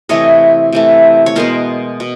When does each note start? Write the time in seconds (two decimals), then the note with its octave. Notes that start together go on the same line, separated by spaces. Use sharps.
0.09 C3 E3 A3 C#5 D#5
0.72 C3 E3 A3
1.26 C#5
1.36 B2 G#3 B3 A#4 C5
2.00 B2